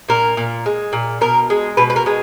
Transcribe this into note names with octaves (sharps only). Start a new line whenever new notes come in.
A#2 A#4
A#2
G#3
A#2
B2 A#4
G#3
B2 B4
B4
A#4
G#3